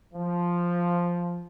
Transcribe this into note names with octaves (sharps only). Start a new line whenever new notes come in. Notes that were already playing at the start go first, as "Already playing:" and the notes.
F3